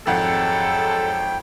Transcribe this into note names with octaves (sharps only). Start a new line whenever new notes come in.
G#1 F2 F#3 G#3 A4 F#5 G5